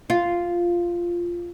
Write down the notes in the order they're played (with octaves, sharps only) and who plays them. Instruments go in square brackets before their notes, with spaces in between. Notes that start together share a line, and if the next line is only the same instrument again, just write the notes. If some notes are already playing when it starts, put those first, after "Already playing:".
[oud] F4